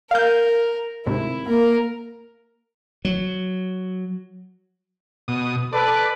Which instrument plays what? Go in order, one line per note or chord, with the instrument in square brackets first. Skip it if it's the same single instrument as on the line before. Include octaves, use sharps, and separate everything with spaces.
[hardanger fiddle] A#4 [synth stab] F5 G6
[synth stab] D2 G#2 C3 [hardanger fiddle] E4
[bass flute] A#3 [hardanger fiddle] A#4
[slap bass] F#3
[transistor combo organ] B2 D#6
[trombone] A4 [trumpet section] B4 [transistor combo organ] D5